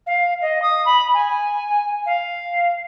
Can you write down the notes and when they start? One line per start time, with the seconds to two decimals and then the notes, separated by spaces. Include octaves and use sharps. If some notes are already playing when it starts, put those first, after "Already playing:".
0.07 F5
0.41 D#5
0.62 D#6
0.85 B5
1.14 G#5
2.06 F5